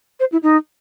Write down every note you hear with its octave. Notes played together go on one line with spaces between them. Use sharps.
C5
E4
D#4